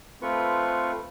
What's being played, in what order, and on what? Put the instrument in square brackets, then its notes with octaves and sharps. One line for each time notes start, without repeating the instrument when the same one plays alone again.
[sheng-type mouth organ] A3 C4 F4 B4 C#6